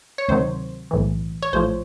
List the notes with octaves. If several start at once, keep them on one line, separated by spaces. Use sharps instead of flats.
C#5
D2 C3 D#3 F#3 C5
B1 A2 E3
C#5
A#1 A2 F3 C5